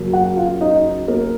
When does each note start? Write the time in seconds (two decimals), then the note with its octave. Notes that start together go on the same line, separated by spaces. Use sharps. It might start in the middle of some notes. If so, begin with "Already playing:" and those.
Already playing: F#2 C#3 F#3 A#3 C#4
0.13 F#4 F#5
0.36 F4 F5
0.61 D#4 D#5
1.08 A#3 A#4